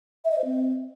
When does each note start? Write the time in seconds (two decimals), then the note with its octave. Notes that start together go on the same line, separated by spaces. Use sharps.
0.25 E5
0.31 D#5
0.38 C5
0.45 C4